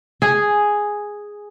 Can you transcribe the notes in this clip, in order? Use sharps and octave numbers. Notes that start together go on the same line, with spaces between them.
G#4